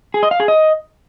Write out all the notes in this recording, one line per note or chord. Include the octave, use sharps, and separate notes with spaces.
G#4
D#5
F5
G#4
D#5